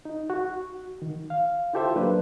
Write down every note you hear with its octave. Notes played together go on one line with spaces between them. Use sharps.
D#4
F#4
D#3
F5
E4 F4 G4 A4 C5 E5
F#3 A#3 D4 B4